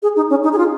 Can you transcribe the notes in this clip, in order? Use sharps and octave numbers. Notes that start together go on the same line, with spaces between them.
G#4
D#4
C#4
D#4
G#4
F4